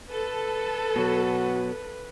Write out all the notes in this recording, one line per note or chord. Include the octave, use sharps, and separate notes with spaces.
A4 B4
B2 F#3 F#4